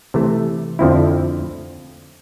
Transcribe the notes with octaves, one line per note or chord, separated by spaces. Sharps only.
C3 E3 A3
F2 D3 F3 C4 E4